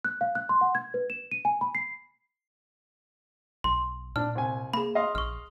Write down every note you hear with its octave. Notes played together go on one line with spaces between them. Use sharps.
F#6
F5
F#6
C6
F#5
G#6
B4
E7
D#7
G#5
B5
C7
B1 C6
A#2 D4 F6
C2 G#5
A#3 G#4 B5
D#5 F5 C6
A#1 C#6 F6